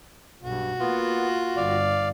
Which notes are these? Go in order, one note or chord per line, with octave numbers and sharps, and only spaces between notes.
B1 G2 F#4
A#3 B3 F4
G1 D5 F5